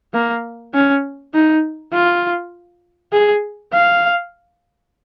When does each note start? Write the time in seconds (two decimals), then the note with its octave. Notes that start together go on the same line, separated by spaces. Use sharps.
0.14 A#3
0.74 C#4
1.34 D#4
1.93 F4
3.13 G#4
3.73 F5